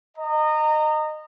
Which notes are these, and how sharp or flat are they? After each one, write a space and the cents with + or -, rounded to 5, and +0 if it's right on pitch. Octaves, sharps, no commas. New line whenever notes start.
D#5 -20 A#5 -25